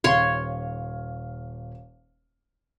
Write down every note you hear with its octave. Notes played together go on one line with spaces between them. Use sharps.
D#1 C#5 F5 C6